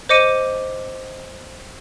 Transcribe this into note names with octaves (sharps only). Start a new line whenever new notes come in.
C5 D#5 D6 C#7 D#7